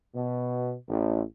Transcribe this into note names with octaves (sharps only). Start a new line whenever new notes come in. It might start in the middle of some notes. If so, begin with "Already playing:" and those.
B2
A1